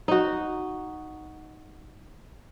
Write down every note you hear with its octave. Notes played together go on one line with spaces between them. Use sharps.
D#4 F#4